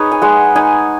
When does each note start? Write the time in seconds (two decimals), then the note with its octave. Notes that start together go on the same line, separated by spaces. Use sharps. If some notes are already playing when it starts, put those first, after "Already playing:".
Already playing: D#4 G#4 B4 C#5
0.12 G#5
0.22 G#3 F#5
0.56 D#4 G#5